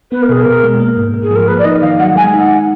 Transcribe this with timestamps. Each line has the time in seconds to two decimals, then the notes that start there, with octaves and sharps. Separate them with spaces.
0.12 B3 B4
0.22 A#4
0.29 B2 G#4
0.42 B2 A#4
0.64 G#3
0.80 A#3
0.97 G#2
1.14 G#2
1.23 G#4
1.31 F3 A#4
1.48 A#3 B4
1.59 D5
1.65 D#4 D#5
1.82 D#3 F5
1.99 F#3 F#5
2.16 G#3 G#5
2.34 D#4
2.40 F#5